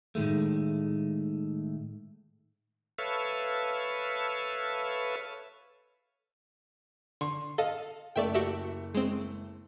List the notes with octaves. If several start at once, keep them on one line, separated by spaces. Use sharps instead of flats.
A2 D#3 G#3 A3
A4 B4 C#5 E5 F5
D3 C6 C#6
A4 D#5 F5
F#1 A3 D5 E5 G5
F#4 G4 E5
G#3 C4